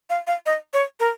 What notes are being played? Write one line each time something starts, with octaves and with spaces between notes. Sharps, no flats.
F5
F5
D#5
C#5
A#4